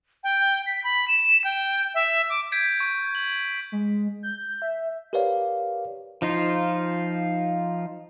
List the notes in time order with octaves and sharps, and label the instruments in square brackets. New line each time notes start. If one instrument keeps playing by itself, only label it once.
[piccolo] G5
B6
B5
E7
G5
E5
D6
[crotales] G6 G#6 B6 D7
C#6 D7
F#7
[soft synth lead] G#3
G6
E5
[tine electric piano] G4 A#4 B4 C#5 D5 F5
[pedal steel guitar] F3 D#4 F4